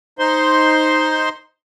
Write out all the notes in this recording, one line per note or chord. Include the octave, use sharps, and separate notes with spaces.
D#4 C5 C6